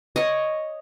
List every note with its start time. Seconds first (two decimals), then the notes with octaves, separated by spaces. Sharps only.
0.16 C#5 D#5